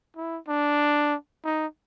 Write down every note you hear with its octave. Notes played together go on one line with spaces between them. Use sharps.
E4
D4
D#4